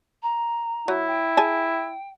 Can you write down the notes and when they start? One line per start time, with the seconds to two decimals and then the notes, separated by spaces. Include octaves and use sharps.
0.22 A#5
0.88 F#3 E4
1.07 G5
1.37 G#4 G#5 A5